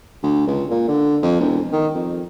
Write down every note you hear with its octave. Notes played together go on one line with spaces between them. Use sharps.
D2
C#2
A#2
D3
F2
E1
D#3
F2